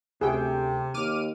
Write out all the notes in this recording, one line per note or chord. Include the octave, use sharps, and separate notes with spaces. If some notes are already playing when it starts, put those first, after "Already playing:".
D2 C3 A3 G#4 G5
D#2 D6 F6 D#7